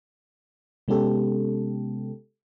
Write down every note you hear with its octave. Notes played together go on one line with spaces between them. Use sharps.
C3 G#3 B3 C#4 G4 A4